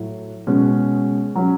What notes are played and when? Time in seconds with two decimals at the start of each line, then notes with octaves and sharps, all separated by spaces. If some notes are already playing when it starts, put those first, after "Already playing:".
Already playing: A2 F#3 A3
0.47 B2 G#3 C#4
1.35 F#3 C#4